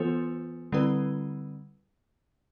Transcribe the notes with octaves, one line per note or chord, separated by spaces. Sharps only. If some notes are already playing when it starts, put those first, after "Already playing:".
Already playing: E3 B3 F4 A4 C5
D3 G3 C4 E4 B4